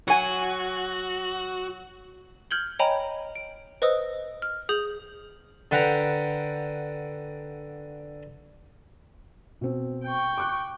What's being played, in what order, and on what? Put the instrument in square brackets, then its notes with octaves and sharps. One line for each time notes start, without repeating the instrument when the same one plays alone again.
[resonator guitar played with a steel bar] F#3 G#5 [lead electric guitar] F#4
[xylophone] F6 G6 G#6 F#7 G7
C#5 D#5 G5 G#5 A#5 B5
D7
B4 C5 D#5 D#6 E6
F6
G#4 D#6 G6 F#7
[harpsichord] D3 B4 F#5 G5 A#5
[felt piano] B2 C4
[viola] G5 C#6
[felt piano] D6 F#6